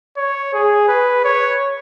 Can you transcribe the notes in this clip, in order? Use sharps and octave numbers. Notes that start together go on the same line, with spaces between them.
C#5
G#4
B4
C#5